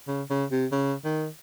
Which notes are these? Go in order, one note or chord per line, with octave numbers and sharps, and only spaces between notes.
C#3
C#3
C3
C#3
D#3